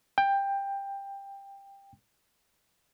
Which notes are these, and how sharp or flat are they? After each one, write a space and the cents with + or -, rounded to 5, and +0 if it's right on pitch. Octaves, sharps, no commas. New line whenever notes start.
G5 +15